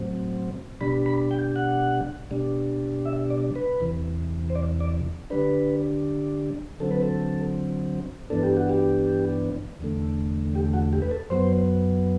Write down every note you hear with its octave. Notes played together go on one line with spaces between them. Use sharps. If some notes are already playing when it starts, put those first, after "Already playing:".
Already playing: A2 F#3 C4
B2 G3 D4 B5
B5
G5
F#5
B2 G3 D4
E5
D5
B4
E2 C3 E3
C5
D5
D5
D3 G3 D4 B4
D3 F#3 C4 A4
B4
A4
G2 E3 B3 D4 A4
G4
F#4
G4
E2 D3 A3
G4
F#4
G4
B4
A4
F#2 F#3 B3 C5